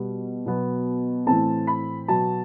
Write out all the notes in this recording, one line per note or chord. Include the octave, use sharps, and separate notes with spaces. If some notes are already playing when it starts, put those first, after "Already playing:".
Already playing: B2 G3 B3
B2 F#3 B3
A2 E3 A3 C4 A5
B5
B2 F#3 B3 A5